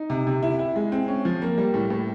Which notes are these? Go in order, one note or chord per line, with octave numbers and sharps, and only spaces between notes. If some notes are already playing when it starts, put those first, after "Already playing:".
Already playing: D#4
C3
C3
E4
E4
G#3
C4
C#4
F3
A#3
G3
A2
A2